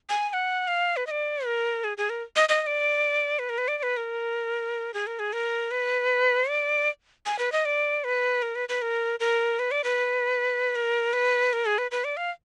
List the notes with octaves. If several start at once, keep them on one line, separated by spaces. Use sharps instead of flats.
G#5
G#5
F#5
F5
B4
D#5
D5
A#4
G#4
G#4
A#4
D#5
D#5
D#5
D5
B4
A#4
B4
D5
D5
B4
A#4
G#4
A#4
G#4
A#4
B4
D5
G#5
B4
D#5
D5
B4
A#4
B4
B4
A#4
A#4
B4
D5
B4
A#4
B4
A#4
G#4
B4
B4
D5
F5